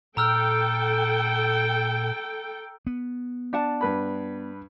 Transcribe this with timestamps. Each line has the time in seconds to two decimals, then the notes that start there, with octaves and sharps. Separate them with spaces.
0.17 A#2 A4 G5 A#5 E6 F6
2.87 B3
3.53 D4 F#5 A5
3.81 G2 B4 B5